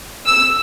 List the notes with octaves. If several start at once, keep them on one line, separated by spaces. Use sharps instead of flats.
E6